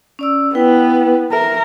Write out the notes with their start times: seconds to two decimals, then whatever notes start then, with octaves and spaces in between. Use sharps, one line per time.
0.19 C#4 D5 E6
0.55 B3 E4 B4 G5
1.33 A#4 E5